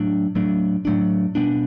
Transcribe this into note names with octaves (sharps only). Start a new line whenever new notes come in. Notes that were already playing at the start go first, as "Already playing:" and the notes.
Already playing: A2 F#3 A3 D4
A2 F#3 A3 D4
A2 F#3 A3 D4
B2 G3 B3 D4